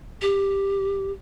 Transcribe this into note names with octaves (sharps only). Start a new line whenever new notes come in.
G4